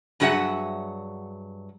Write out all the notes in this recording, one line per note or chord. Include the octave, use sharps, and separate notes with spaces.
G2 F#3 F#4 G#4 E5 F#5